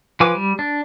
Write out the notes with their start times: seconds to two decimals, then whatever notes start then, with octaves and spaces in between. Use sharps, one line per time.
0.20 F3 B4 G#5 D6
0.35 G3
0.59 D4